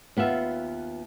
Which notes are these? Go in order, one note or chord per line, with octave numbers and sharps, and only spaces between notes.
D#2 B3 F4 E5